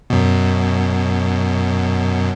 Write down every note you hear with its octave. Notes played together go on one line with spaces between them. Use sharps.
F#2 B2